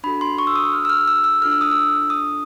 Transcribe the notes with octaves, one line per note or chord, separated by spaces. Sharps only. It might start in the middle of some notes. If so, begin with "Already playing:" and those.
D4 F#4 A4 B5
C6
C#6
E6
D#6
F6
E6
F6
E6
E6
D4 F4 A4 F6
E6
D#6
E6
D#6